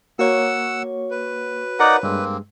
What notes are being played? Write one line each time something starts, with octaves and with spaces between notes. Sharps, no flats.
A#3 F#4 C#5 F#5 E6
B4
D#4 A#4 D5 F5 F#5
G2 G#3 A#3 C4